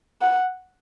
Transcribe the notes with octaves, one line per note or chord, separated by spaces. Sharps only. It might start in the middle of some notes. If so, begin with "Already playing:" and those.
F#5